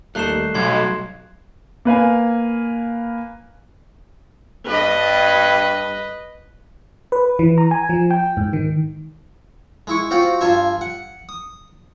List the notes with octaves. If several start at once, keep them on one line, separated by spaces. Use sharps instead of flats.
D#2 G3 A3 D#4 F#6 C7 E7
B1 F#3 C6 G#6
A#3 B4 F5 G#5
G2 B4 D#5
B4
E3
A#5
G#5
F3
G5
G#2
D#3
G#3 E4 C#6
C4 F4 F#4 F#5
G2 F4 E5 G#5
F#5
D#6